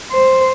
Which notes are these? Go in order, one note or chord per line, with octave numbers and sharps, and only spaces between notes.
C5